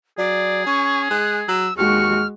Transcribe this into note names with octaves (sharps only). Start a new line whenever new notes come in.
F#3 G#4 D5
C#4 C#6
G#3 F#6
F#3 E6
D#2 G#3 F#4 C#6 F6